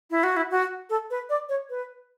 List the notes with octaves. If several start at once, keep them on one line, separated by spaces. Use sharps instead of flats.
E4
F#4
E4
F#4
A4
B4
D5
C#5
B4